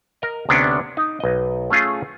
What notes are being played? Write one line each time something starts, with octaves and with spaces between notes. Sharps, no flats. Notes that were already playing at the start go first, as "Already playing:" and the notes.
A#4 D#5
D2 C3 B3 C#4 D4
D#4
B1 D#5
A3 C#4 F4 G#4